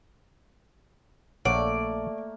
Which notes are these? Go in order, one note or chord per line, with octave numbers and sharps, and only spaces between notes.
A#1 A3 A#3 C#5 D5 F#5